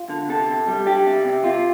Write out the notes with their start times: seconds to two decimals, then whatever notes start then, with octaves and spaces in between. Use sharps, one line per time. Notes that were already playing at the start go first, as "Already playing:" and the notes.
Already playing: F4
0.10 D3
0.29 C3 A4
0.48 C3
0.67 G3
0.86 D4 G4
1.06 C3
1.25 C3
1.44 C3 F4